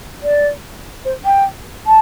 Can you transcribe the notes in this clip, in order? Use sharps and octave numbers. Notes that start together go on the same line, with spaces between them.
D5
C5
G5
A5